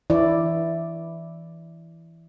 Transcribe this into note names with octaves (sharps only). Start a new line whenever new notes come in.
E3 E4 D5